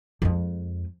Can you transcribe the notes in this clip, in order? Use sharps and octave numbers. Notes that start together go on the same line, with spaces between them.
F2 G#3